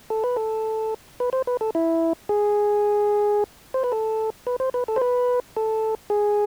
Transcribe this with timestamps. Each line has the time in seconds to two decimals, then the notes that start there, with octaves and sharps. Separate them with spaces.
0.10 A4
0.24 B4
0.36 A4
1.20 B4
1.33 C5
1.47 B4
1.61 A4
1.75 E4
2.29 G#4
3.74 C5
3.84 B4
3.92 A4
4.47 B4
4.60 C5
4.74 B4
4.88 A4
4.96 C5
5.01 B4
5.57 A4
6.10 G#4